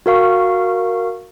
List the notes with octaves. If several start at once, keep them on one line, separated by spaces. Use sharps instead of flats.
F#4 A#4 F5 C#6